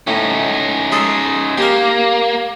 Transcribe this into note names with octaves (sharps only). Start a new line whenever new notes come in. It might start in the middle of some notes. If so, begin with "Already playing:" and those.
A2 C#4 D#4
G#3 G#4 A4
A#3 G4 A#4